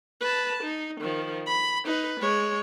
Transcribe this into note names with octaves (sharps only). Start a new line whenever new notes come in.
B4 A5
D#4
D#3 F3
B5
D#4 B4
G#3 C#5